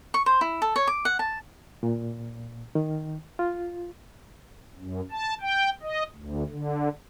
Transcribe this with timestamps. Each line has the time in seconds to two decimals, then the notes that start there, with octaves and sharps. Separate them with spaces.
0.14 C#6
0.26 C5
0.41 E4
0.62 A4
0.76 C#5
0.87 D6
1.05 F#5
1.19 A5
1.83 A#2
2.75 D#3
3.39 F4
4.79 F#2
5.11 A5
5.41 G5
5.82 D#5
6.15 D2
6.49 D3